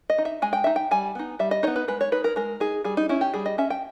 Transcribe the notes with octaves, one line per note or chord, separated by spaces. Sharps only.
D#5
D#4
E5
G#3 G#5
G5
D#4 E5
G5
G3 G#5
B3 D#4
G3 E5
D#5
B3 D#4 C#5
B4
G#3 B4
C#5
D#4 B4
A#4
G#3 A#4
D#4 G#4
G3 G#4
D#4
C#4 E4
G4
G3 G#4
D#5
C#4 E5
G5